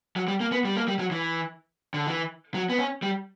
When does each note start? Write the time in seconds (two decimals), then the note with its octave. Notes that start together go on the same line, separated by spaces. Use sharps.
0.16 F#3
0.28 G3
0.41 A#3
0.52 B3
0.65 G3
0.76 A#3
0.88 G3
0.99 F#3
1.11 E3
1.94 D3
2.07 E3
2.54 F#3
2.69 B3
2.79 C#4
3.02 G3